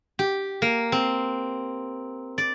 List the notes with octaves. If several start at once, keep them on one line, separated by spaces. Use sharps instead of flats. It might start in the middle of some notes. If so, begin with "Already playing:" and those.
G4
A#3
C4
D5